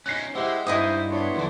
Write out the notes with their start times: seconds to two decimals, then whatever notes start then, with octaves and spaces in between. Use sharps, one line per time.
0.06 C#4 D#4 F#6 A#6 C7
0.35 G#3 E4 G4 C5 F#5 E6
0.67 G2 D#4 E4 C5 D#5 E5 D#6
1.10 B3 D4 C#5 C6
1.35 E2 D3 E3 F#3 D4